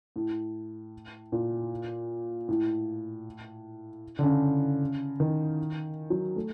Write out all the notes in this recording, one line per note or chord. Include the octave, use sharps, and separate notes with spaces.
A2
A#2
A2
D3
C#3
D#3
F#3
A3